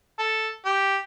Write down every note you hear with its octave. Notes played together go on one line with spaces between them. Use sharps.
A4
G4